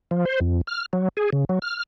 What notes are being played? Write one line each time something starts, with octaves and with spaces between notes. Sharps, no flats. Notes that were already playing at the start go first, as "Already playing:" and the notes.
F3
C5
F2
F6
F#3
G#4
C#3
F#3
F6